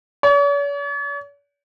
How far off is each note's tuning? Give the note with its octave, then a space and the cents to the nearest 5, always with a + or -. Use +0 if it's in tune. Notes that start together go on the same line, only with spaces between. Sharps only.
C#5 +45